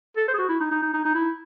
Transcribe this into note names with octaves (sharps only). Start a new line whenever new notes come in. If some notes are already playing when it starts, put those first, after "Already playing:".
A4
C5
G#4
F#4
E4
D#4
D#4
D#4
D#4
D#4
E4